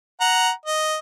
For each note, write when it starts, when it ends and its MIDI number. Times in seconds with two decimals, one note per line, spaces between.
0.20 0.50 78
0.20 0.50 82
0.66 0.96 75